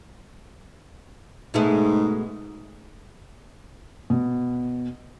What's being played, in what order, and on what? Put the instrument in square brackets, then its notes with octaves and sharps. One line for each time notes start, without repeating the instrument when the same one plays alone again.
[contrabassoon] G#2 [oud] B2 G#3 A3
[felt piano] B2